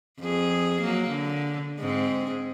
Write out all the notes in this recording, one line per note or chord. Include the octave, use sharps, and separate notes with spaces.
F2 G#4
F#3 A#3
D3
G#2 C4 G#4